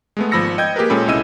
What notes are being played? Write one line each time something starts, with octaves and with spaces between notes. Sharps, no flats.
G#3 A3 B3
G#1 F3 B5 E6 A#6 C#7
D#5 G5 G6 G#6
A#3 G4 G#4 A#4 B4
A#2 G#3 C#4 A4 B5
C2 C#4 E4 D#5 E6 D#7